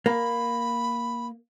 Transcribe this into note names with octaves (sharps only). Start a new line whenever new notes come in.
A#3 B5